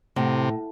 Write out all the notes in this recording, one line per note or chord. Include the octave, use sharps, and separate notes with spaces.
A2 C3